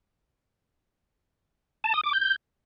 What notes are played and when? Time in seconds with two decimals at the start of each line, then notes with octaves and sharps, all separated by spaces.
1.84 A5
1.94 D#6
2.04 D6
2.13 G6